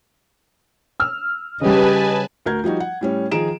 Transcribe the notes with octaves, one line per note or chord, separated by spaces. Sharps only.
E6 F6
C#3 G3 G4 B4 D#5 G#5 A5
D2 F#4 A#4 G6 G#6
F3 G3 D#4 F#4
F#5
A2 G3 C#4
D#3 F3 G#4 A#5 D7 E7